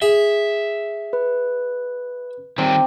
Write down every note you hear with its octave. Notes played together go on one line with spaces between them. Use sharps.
G#4 E5
B4
C3 D#3 G3